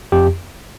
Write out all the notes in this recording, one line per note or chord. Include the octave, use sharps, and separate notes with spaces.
F2 G4